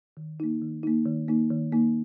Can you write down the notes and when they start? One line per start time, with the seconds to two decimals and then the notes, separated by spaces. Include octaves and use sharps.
0.17 D#3
0.40 A#3 D#4
0.62 D#3
0.83 A#3 D#4
1.06 D#3
1.28 A#3 D#4
1.50 D#3
1.72 A#3 D#4